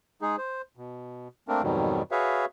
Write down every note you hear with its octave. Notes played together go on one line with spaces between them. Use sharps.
G#3 D#4 G#4
C5
B2
A3 A#3 C4 D4 A#4
F2 G#2 B2 D#3 F#3 G3
F#4 G#4 B4 C#5 E5 F5